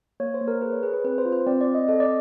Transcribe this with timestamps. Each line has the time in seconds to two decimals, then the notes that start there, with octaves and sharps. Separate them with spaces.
0.20 A#3 C#5
0.34 C5
0.41 A#3
0.48 A#4
0.62 G#4 B4
0.72 C#5
0.83 G#4 B4
0.94 B4
1.04 C4 B4
1.18 C5
1.25 F4
1.32 C5
1.46 C4 D5
1.61 D5
1.67 C4
1.75 D#5
1.88 A4 D#5
2.00 D5